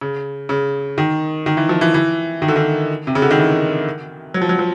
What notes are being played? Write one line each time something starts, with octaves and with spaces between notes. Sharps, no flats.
C#3
C#3
D#3
D#3
E3
F3
E3
E3
D#3
D3
D#3
C3
C#3
D3
D#3
E3
F#3
F3
F#3
F3